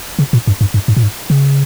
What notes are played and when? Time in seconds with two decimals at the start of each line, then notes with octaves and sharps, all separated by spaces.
0.19 C#3
0.33 A#2
0.47 G2
0.61 G2
0.74 G2
0.88 G#2
0.97 A#2
1.03 G#2
1.30 C#3